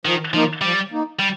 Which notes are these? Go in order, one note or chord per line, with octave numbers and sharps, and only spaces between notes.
D#3 F3
F3 A#3 D#4
F3 G3
A#3 D#4
G3